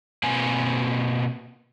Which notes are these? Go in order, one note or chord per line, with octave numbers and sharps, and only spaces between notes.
B2 A#3 C4 B4 G#5